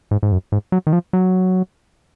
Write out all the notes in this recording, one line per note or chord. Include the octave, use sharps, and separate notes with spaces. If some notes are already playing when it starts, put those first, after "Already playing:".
G#2
G#2
F#2
G#2
F#3
D#3
F3
F#3